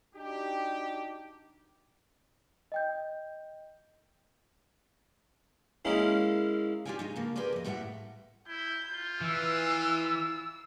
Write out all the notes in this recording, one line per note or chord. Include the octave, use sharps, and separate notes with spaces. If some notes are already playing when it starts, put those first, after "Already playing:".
D4 D#4 F#4 G4
D#5 G5 G6
G#3 A#3 C#4 E4
F4 G4 D5 F5 G5 G#5
D#3 G#3 D#4
C#3 F3 A#3
B3 G4 G#4 A#4 C5 D5
F2 D#5
A2 G3 B4 C5 E5 F#5
E4 G6
F4
E3 E6